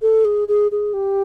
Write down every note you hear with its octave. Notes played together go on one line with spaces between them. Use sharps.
A4
G#4
G#4
G#4
G4